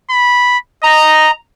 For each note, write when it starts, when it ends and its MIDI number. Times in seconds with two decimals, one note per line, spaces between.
0.10 0.58 83
0.84 1.30 75
0.84 1.31 82